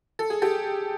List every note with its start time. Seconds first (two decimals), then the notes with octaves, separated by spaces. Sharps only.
0.19 A4
0.30 G#4
0.42 G4 A4